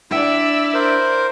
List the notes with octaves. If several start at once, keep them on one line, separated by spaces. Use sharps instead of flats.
D4 E4 D5 E5 F#5 G5
A#4 C5